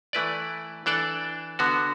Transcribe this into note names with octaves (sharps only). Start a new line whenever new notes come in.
E3 A3 E4 B4 D5
E3 D4 A4 D5
D3 B3 F#4